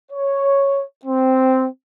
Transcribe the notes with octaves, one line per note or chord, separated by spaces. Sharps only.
C#5
C4